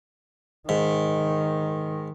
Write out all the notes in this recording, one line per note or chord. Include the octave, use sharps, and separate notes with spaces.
G#2 D#3